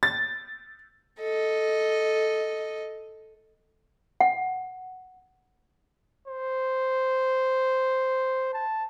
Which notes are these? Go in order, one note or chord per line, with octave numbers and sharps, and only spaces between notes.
A6
A4 D#5
F#5
C5
A5